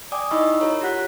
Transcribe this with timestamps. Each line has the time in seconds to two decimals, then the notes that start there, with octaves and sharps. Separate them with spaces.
0.12 D5 G5 G#5 D6 D#6
0.31 D#4 E4 D#5 B5 C#6 E6
0.60 F#4 A#4 C#5 A#5
0.81 F4 G4 C#5 F#5 F#6 B6